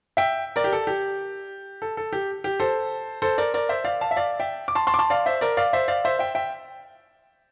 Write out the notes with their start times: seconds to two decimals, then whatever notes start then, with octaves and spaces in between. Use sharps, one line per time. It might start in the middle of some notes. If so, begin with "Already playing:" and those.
0.17 E5 G5
0.56 A#4 D5
0.64 G4
0.73 A4
0.87 G4
1.82 A4
1.97 A4
2.13 G4
2.44 G4
2.60 A4 C5
3.22 A4 C5
3.38 A#4 D5
3.54 A#4 D5
3.69 C5 E5
3.84 D5 F5
4.01 F5 A5
4.11 E5
4.16 D5 F5
4.40 E5 G5
4.68 D6
4.75 A5 C6
4.87 A5 C6
4.94 D6
4.99 A5 C6
5.10 D5 F5
5.26 C5 E5
5.41 A#4 D5
5.57 D5 F5
5.73 C5 E5
5.88 D5 F5
6.05 C5 E5
6.19 E5 G5
6.35 E5 G5